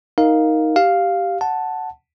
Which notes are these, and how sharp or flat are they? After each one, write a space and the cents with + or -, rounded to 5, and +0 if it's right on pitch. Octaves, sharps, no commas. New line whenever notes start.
D#4 +10 A#4 +0 F5 +0
G4 -10 F5 +0
F#5 +0 A5 +0